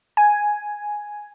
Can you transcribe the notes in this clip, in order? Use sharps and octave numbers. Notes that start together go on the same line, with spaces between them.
G#5